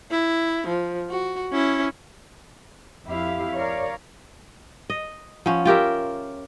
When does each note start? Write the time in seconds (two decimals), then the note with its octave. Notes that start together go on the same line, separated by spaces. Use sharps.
0.11 E4
0.67 F3
1.10 F#4
1.52 C#4 E4
3.05 F2 E4 G4 F5
3.56 A#4 C#5 D5 F5
4.90 D#5
5.46 F3 B3 C#4
5.65 F4 G4 A#4 E5